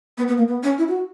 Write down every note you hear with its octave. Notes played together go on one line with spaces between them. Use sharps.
B3
B3
A#3
B3
C#4
E4
F#4